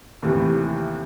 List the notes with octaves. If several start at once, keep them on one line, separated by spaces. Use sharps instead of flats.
D#2 A2 C3 E3